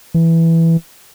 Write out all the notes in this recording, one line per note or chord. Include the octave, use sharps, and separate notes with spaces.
E3